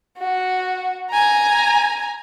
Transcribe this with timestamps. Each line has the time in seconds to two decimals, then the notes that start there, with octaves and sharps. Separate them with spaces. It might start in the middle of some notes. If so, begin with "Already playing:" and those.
0.19 F#4
1.10 G#5 A#5